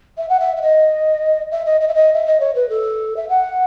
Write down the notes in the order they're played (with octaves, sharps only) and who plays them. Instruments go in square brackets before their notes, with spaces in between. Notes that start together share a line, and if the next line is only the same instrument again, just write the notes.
[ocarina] E5
F#5
E5
E5
D#5
E5
D#5
D#5
E5
D#5
E5
D#5
C#5
B4
A4
E5
F#5